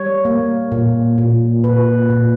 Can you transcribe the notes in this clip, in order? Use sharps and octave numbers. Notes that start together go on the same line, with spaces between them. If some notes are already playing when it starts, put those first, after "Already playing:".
Already playing: G3 C#5
A#3
A#2
A#2
A#2 B4
A#2